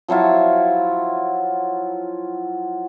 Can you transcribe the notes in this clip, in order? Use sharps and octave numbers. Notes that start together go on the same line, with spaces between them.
F3 F#3 E4 F4